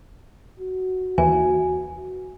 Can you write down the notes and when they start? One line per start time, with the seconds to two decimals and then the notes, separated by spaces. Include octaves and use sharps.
0.59 F#4
1.18 D#2 E3 G#5